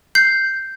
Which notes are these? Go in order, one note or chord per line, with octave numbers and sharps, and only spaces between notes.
G6 C7